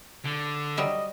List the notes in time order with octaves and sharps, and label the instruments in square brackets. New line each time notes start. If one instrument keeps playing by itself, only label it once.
[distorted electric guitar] D3
[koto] F#3 G3 E5 [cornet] D#5